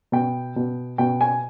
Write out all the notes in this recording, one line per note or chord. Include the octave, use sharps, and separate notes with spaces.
B2 G5
B2
B2 G5
G#5